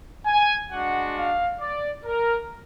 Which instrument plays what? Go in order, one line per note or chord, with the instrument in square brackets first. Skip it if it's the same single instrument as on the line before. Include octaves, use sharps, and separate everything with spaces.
[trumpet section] G#5
G#3 D4 F#4 F#5
F5
D5
A#4